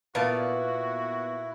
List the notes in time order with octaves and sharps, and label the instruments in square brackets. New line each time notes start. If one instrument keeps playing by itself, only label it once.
[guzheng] A#2 [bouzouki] B3 F5 A5 [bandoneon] E4 [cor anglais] F#4